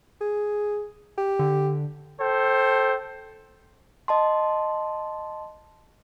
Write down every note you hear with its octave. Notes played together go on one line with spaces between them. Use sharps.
G#4
G4
D3
A4 C5 G5
D#5 A5 C6